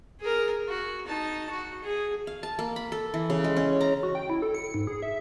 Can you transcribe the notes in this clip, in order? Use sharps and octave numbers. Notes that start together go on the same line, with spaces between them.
G#4 A#4
F#4
D#4 A5
F#4
G#4
F5
A5
A#3
B5
A4
E3
C#3
G#3
C#4
A#5
F#4
G5
E4
A4
C#7
G#2
G#4
E5